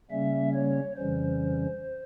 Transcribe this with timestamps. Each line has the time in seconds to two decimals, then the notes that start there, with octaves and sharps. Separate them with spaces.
0.10 C#3 G3 A#3 C#4 E5
0.54 C#5
0.96 F2 C#3 E3 G3 C#4 C5